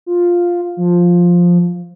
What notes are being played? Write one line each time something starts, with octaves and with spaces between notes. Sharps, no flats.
F4
F3